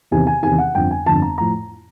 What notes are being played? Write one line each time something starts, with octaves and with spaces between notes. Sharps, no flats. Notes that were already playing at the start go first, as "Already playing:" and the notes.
E2 C3 D#3 G#5
G#5
E2 C3 D#3 G#5
F#5
G1 F2 D3 F3 G5
G#5
G1 F2 D3 F3 A5
A#5
A2 F3 A#5